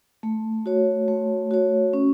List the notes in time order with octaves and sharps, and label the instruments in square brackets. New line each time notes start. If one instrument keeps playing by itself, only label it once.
[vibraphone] A3
F#4 C#5
A3
F#4 C#5
C#4